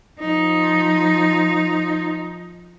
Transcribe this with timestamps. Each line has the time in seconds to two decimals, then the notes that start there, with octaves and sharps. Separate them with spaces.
0.20 F3 D#4